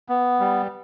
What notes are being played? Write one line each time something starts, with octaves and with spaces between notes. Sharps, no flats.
B3
G3